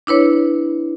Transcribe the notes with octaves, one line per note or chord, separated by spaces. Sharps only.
D4 E4 B4 C#5